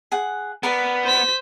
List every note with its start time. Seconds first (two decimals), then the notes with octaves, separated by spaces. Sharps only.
0.12 G#4 F#5
0.63 B3 A#4 B4 D5
1.04 C5 B6